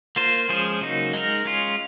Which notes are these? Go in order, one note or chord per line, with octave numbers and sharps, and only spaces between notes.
A#3 F4 C5
F3 G#3 C#4 G#4 C5
C#3 F#3 A#3 D#4
G#3 D#4 A#4
G#3 C#4 F4